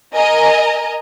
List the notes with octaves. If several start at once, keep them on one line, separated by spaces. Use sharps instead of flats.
A#4 D#5 G#5 A#5